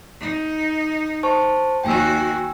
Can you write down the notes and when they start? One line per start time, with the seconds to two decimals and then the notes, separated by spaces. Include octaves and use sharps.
0.20 D#4
1.23 C5 A5 C#6
1.84 D#2 F#4 G5 G#5 E6